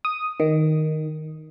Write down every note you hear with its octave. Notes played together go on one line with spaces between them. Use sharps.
D#6
D#3